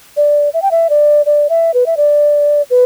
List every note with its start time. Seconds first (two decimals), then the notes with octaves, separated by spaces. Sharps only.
0.17 D5
0.54 E5
0.62 G5
0.71 E5
0.90 D5
1.26 D5
1.50 E5
1.74 B4
1.86 E5
1.97 D5
2.70 B4